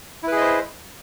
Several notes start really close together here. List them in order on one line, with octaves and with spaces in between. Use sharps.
E4 B4 G#4 D#5 C5